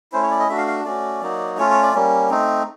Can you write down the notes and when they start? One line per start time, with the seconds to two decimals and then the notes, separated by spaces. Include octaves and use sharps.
0.12 A3 C#4 E4 C5
0.22 C#5
0.30 D5
0.39 D#5
0.49 A3 D4 F#4 E5
0.57 F5
0.67 F5
0.85 A3 C#4 F#4 D5
1.21 F#3 A#3 D#4 F#4
1.58 A3 C#4 F4 C#5
1.70 C#5
1.82 D5
1.94 G3 A#3 C#4
2.30 A3 C4 D#4